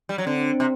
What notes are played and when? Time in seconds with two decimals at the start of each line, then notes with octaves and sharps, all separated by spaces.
0.09 G3
0.18 F#3
0.27 D3 C4
0.60 C3